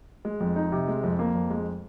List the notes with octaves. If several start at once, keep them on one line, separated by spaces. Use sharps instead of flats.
G#3
F2
D#4
C3
G#3
F2
A#3
F2
G#3